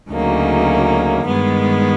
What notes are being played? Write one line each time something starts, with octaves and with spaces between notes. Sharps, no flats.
D2 C#3 F#3 A#3 D#4
G2 D#3 G#3 B3